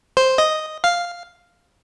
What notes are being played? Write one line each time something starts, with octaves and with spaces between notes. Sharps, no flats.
C5
D#5
F5